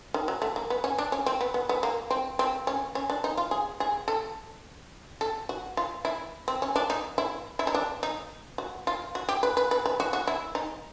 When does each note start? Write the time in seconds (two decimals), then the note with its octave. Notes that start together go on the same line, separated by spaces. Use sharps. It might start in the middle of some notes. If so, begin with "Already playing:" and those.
0.14 D#3
0.28 F#3
0.42 A3
0.56 A#3
0.70 B3
0.84 C#4
0.98 D4
1.12 C#4
1.26 C4
1.41 B3
1.54 B3
1.69 B3
1.83 A#3
2.11 C4
2.39 C4
2.67 C#4
2.95 C#4
3.10 D4
3.24 D#4
3.37 F4
3.51 G#4
3.80 G#4
4.08 A4
5.21 A4
5.49 F#4
5.77 F4
6.05 E4
6.48 C4
6.62 C#4
6.76 D4
6.90 D#4
7.18 E4
7.59 E4
7.67 D#4
7.74 D4
8.03 D#4
8.58 F#4
8.87 F4
9.15 F#4
9.29 G4
9.43 B4
9.57 B4
9.71 B4
9.86 B4
10.00 F#4
10.13 F#4
10.27 E4
10.55 D#4